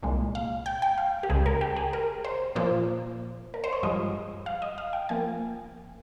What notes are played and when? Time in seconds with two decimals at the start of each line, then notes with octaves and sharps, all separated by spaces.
0.03 C2 A#2 G#3
0.35 F5
0.66 G5
0.82 G5
0.98 F5
1.23 G4
1.29 C#2 C#3 G#3 G#4
1.46 A#4
1.61 G4
1.76 G#4
1.93 A#4
2.25 C5
2.55 A#2 F3 A#3 C5
3.54 A#4
3.64 C5
3.73 C#5
3.83 G2 F3 G#3 D#5
4.46 F5
4.62 D#5
4.78 F5
4.93 G5
5.09 F3 A#3 G#5